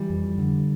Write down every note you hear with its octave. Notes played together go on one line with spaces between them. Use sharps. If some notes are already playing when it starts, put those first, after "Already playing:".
Already playing: E3 G3
F2
D3